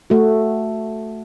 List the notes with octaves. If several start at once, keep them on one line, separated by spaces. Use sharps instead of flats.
A3 F#4